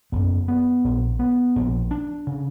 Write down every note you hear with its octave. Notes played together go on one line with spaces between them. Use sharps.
F#1 F#2 C#3 B3
B3
A#1 A#2
B3
A#1 A#2
D4
C#3